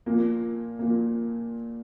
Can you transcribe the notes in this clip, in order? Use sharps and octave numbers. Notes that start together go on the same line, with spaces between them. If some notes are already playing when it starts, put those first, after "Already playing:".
A#2 F3 A#3
A#2 F3 A#3